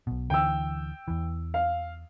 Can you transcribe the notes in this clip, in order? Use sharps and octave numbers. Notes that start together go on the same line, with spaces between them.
B1 B2
D2 D3 E3 G5 E6
E2 E3
F5